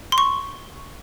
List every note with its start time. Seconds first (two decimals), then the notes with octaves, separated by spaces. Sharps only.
0.12 C6
0.18 C#6